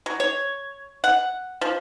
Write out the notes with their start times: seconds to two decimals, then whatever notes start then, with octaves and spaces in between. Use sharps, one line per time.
0.06 F#3
0.20 C#5
1.04 F#5
1.61 F3